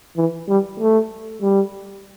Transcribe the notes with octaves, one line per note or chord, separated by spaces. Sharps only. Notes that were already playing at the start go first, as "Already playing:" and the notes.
E3
G3
A3
G3